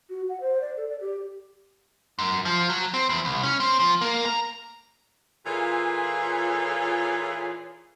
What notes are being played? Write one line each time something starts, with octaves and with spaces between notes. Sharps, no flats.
F#4
F#5
C5
D5
A4
D5
G4
F#2
F3
F#3
C4
E2
C2
C#4
C4
F3
A#3
A#5
A#2 E3 F4 G#4 A4 C#5